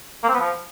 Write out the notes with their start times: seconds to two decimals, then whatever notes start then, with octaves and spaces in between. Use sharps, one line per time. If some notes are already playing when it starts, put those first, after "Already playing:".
0.23 A#3
0.29 C4
0.34 B3
0.40 F3